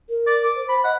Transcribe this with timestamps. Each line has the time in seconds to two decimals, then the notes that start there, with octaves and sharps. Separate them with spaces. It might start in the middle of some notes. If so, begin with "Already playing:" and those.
0.10 A#4
0.26 D5
0.43 D6
0.56 C5
0.69 B5
0.84 D#5 F#5